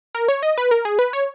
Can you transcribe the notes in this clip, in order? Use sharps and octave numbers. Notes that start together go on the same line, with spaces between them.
A#4
C#5
D#5
B4
A#4
G#4
B4
C#5